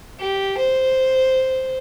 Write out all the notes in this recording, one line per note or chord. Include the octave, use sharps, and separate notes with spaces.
G4
C5